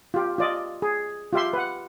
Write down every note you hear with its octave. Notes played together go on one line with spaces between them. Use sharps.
F4 G4
F4 D5 D#5
G#4
F4 G4 E5 C6
B4 F#5